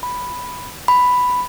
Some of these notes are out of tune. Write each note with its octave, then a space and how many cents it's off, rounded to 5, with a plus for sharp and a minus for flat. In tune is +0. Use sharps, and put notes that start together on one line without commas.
B5 +0
B5 +5